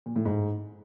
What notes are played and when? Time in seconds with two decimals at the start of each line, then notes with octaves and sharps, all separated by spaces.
0.06 A#2
0.16 A2
0.25 G#2